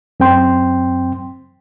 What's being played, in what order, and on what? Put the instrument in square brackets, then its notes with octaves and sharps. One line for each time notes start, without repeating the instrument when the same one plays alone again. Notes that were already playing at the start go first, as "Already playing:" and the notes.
[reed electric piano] F#2 C4 G5 C6